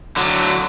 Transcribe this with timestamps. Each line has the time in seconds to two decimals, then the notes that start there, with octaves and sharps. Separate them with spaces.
0.16 D3 F#3